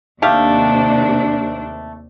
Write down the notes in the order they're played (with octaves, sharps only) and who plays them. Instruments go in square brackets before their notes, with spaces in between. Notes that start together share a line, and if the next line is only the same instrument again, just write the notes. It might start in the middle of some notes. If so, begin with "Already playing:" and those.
[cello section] D#2 C3 D4 [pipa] A3 G4 F5